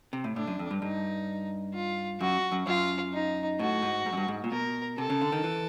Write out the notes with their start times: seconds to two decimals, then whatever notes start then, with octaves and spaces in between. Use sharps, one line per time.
0.13 C3
0.24 A2
0.36 A2 D4
0.47 F#2
0.59 F2
0.71 G2
0.82 G2 D#4
1.74 F4
2.20 F#2 F#4
2.52 F#2
2.67 F#2 F4
3.13 D#4
3.59 A2 F#4
3.82 G#2
4.06 G#2
4.13 F#2
4.17 G2
4.28 G#2
4.44 A#2
4.51 B2 A#4
4.98 C3 A4
5.10 C#3
5.21 D3
5.32 D#3
5.44 E3